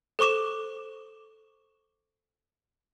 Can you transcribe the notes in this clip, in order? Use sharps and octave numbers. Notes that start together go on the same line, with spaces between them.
A4 C5 C#6 D6 E7